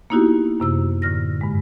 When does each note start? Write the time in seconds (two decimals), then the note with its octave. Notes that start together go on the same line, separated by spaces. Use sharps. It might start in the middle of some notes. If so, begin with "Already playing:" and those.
0.10 A#3 B3 D#4 E4 F#4 G4
0.60 F#2 C3 E6
1.02 A2 D3 F6 A#6
1.41 G2 G#3